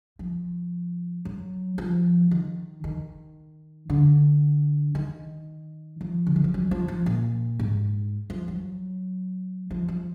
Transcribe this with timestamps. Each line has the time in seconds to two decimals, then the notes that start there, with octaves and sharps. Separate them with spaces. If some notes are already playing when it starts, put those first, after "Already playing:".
0.19 F3
1.25 F#3
1.78 F3
2.31 D#3
2.84 D#3
3.90 D3
4.95 D#3
6.01 F3
6.27 D3
6.36 D#3
6.44 F3
6.54 F#3
6.71 F3
6.88 F3
7.06 A#2
7.60 G#2
8.30 F3
8.48 F#3
9.71 F3
9.88 F3